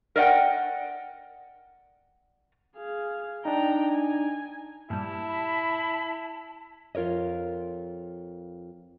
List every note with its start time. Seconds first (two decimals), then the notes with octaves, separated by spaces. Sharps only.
0.16 A#4 D5 D#5 F#5 G5
2.77 G#4 F5
3.45 D4 D#4 G5 A#5
3.92 G#5
4.90 G2 A#2 G3 E4 A5
5.29 B5
6.95 F2 F4 A#4 C#5 D#5